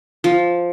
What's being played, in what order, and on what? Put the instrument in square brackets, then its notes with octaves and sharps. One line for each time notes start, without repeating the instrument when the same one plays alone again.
[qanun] F3